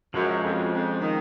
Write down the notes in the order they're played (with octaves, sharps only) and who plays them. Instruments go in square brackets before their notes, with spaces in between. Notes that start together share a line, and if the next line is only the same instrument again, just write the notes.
[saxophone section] F#2 [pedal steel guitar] F3 G#3 C#4
[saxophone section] F2
F2
D#3